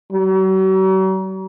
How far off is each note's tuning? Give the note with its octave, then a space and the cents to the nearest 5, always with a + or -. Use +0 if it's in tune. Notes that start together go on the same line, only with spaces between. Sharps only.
F#3 +45